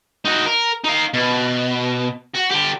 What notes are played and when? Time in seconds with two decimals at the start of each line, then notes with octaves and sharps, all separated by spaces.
0.25 D#4 F#4
0.46 A#4
0.84 D#4 F5
1.14 B2
2.35 F#4
2.51 D3 G4